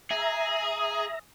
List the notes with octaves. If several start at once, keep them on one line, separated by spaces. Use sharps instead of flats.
G#4 E5 A#5